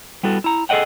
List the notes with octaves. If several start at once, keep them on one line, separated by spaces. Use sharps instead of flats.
G3 B3 E4 F#4 A4
E4 A#5
G#4 A4 D5 D#5 F#5 G5